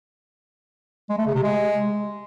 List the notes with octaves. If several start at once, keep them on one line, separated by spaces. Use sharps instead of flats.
G#3
A3
C#3
C3
G#3